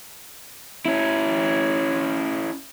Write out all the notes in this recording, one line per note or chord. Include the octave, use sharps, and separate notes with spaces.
C#4 E4